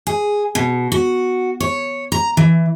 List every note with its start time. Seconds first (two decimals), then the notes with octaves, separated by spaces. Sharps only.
0.07 G#4
0.55 B2
0.92 F#4
1.60 C#5
2.12 A#5
2.37 E3